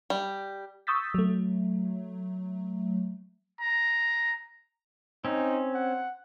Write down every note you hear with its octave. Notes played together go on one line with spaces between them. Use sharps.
G3
C#6 D#6 E6 G6 A6 B6
F#3 A3
A#5
C4 C#4 D#4
F#5